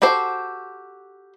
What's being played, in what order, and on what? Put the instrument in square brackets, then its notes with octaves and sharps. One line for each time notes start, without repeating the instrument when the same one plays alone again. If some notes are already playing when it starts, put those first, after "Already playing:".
[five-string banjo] F#4 G4 A4 C5